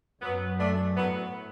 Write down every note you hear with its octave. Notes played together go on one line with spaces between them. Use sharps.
F#2 F#3 B3
A3 D4
A2 F#3 B3